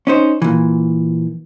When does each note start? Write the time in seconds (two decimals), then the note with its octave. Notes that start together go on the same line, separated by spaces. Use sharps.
0.07 C#4 D#4 C5
0.42 A#2 E3